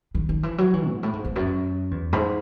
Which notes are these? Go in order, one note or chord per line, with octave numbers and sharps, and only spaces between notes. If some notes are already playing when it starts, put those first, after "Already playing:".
D#3
D#3
E3
F#3
E3
G#2
A2
G#2
E2
F#2
E2
G#2